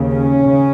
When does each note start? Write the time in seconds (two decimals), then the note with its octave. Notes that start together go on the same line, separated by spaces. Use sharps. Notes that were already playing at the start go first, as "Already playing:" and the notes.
Already playing: D#2 C#3
0.12 C#4
0.42 C#3